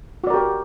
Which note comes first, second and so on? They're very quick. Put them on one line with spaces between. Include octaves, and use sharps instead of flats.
F#4 D5 A#4 G4